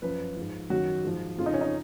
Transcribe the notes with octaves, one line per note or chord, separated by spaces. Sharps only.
F#2 F3 B4
G#2 F3
F#2 D#3 F#3 F#4
G#2 F3
F2 C#3 F3 F4
D#4
C#4
D#4